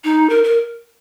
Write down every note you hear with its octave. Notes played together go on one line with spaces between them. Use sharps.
D#4
A#4
A#4